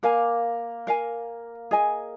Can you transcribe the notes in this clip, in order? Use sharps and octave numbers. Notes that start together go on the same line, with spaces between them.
A#3 A#4 F5 G#5
A#4 F5 G#5
G#4 D#5 G#5